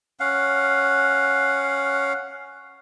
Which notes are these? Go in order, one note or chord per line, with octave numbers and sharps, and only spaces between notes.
C#4 F5 F#5